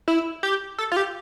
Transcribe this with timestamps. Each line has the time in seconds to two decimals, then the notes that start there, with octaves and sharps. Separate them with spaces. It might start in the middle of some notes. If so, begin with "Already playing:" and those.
0.08 E4
0.43 G4
0.78 A4
0.92 F4
0.97 G4